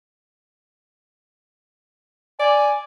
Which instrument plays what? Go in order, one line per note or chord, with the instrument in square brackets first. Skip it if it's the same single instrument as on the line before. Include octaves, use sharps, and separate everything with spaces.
[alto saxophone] D5 [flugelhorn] G#5